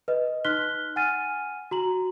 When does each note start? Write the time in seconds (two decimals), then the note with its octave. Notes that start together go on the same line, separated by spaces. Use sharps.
0.08 B4 D#5
0.45 D#4 C6 F6 F#6 B6 G7
0.96 F#5 G#5 F6 A6 D#7
1.71 F#4 A#5 F#7